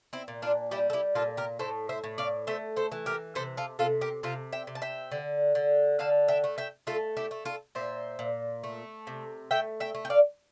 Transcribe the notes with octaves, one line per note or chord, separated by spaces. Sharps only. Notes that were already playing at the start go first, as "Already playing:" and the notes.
C4 E4
A#2
D4 F4
G3 E4 G4
A4
E4 G4
A#2 F4 A4
G4 A#4
A2 A4 C5
C5 E5
A2
D5 F5
A3 C5 E5
A4 C5
E3
G4 A#4
C3 A4 C5
F4 A4
C3 F4 A4
G4 A#4
C3 F4 A4
E5 G5
C3
A5
E5 G5
D3
D3
D3 F5 A5
E5 G5
A3
E5 G5
A3 F4 A4
E4 G4
A3
F4 A4
A#2 C5 E5
A#2
A3
C3
A3 E5 G5
E5 G5
A3
G5
D5 F5